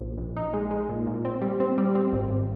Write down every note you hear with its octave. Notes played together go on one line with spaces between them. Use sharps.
A#1
A#1
D#4
G#3
G#3
A#2
A#2
C4
G3
C4
G3
C4
G#1
G#1